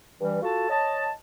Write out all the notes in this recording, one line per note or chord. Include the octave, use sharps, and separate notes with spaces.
G2 E3 G3
F4 F#4 A4 A5
C#5 D#5 A5